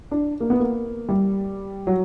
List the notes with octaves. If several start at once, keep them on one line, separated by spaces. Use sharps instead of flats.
D4
A#3
B3
A#3
G3
F#3